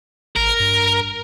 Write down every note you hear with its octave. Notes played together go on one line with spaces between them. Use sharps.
G#1 A#4
G2